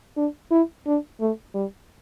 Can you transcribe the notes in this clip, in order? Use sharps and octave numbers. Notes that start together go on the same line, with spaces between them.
D4
E4
D4
A3
G3